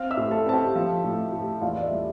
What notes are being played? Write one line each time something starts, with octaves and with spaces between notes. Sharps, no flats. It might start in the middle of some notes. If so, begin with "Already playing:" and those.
Already playing: C4 F5 F6
E5 E6
A2
A4 A5
C4 A5
G4 G5
F3
A2
A2
E2 F4 F5
D5
E4 E5
G3